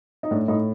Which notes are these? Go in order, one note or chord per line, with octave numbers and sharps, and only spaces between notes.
D#4
A2 D4
A2 D#4